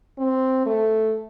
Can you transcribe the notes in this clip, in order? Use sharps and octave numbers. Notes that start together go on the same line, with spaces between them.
C4
A3